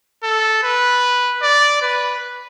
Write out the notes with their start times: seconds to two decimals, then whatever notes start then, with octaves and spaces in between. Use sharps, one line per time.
0.24 A4
0.63 B4
1.42 D5
1.82 B4